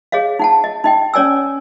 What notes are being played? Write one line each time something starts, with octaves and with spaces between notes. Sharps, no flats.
G#4 C#5 D#5 F5
D#4 F#5 A5
D#5
D#4 D#5 G5
C#4 C#5 D5 G#5 E6